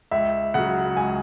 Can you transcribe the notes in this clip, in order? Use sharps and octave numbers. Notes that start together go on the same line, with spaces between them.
C#2 E5
C#3 F#3 F#5
C#2 G#5